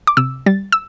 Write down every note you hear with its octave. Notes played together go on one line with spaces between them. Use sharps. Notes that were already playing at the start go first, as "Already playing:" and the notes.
D6
C3 E6
G3 A6
E6